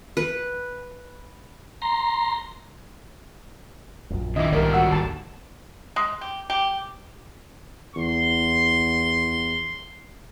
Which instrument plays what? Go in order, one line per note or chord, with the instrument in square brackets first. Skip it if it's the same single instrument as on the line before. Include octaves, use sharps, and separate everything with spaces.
[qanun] B4
[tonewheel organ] A#5 C6
[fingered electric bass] A#1 F#2
[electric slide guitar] D3 D#3 E4 [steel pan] D#5 E5 D6
[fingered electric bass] B1 G#2 D3 [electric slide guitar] D#3 G3 A#3 [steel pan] A#4 D5
[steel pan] F#4 F#5 E6
[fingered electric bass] G#1 D2 [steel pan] A5
[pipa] G#3
G4
G4
[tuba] E2 [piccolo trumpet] C6